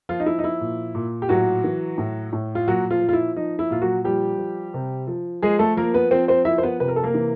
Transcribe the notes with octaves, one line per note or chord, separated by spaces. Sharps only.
F3 F4
D#4
F3 E4
D#4
E4
A#2
A#2
G4
A2 F#3 F#4
E3
A2
A2
F4
A#2 F#3 F#4
F3 F4
F3
F4
E4
F3 D#4
E4
A#2 F4
F#3 F#4
F3 G3 G4
F3
C3
F3
F3 G#3 G#4
A3 A4
F3 A#3 A#4
B3 B4
F3 C4 C5
C4 C5
F3 E4 E5
C5
B3 B4
C3 B4
A#4
A4
A#3 A#4
E3